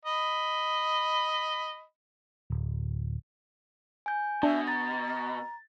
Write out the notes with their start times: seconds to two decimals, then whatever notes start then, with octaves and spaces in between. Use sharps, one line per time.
0.05 D#5 B5
2.50 D1
4.06 G#5 G6
4.43 B2 D4 E5
4.68 A#5 A6